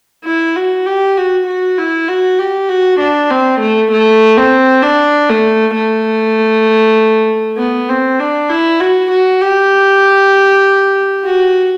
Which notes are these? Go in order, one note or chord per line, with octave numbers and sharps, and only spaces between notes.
E4
F#4
G4
F#4
F#4
E4
F#4
G4
F#4
D4
C4
A3
A3
C4
D4
A3
A3
B3
C4
D4
E4
F#4
F#4
G4
F#4